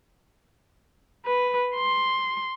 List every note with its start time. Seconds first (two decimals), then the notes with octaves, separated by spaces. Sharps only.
1.25 B4
1.75 C6